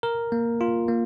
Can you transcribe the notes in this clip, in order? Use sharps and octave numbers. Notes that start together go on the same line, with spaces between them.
A#4
A#3
F4
A#3